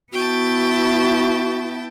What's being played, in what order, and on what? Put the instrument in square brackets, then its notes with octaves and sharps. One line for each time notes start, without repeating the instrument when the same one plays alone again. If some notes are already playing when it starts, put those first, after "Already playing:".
[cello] B3 E4 [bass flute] F#4 [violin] G5 A5